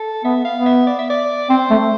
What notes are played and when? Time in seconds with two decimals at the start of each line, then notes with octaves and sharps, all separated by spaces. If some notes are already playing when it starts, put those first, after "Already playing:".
Already playing: A4
0.24 B3 E5
0.45 F5
0.55 B3
0.66 E5
0.87 D5
0.98 E5
1.10 D5
1.50 C4 C5
1.70 A3